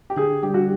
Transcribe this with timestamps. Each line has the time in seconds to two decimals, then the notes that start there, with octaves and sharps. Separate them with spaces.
0.10 G4
0.16 D3 G#4
0.43 G3 G4
0.54 F#4